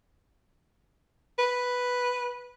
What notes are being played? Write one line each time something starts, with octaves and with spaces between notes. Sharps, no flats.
B4